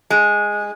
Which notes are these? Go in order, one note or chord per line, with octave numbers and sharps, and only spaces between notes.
G#3